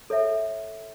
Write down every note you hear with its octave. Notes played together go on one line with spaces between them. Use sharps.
A4 C#5 E5